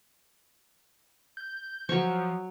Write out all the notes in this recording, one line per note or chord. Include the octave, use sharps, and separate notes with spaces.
G6
F3 F#3 C#5 C#6